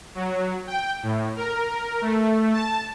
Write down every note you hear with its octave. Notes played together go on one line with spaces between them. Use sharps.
F#3
G5
A2
A#4
A3
A5